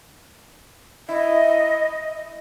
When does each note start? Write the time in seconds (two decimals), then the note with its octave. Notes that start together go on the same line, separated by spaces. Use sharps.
1.09 E4 D#5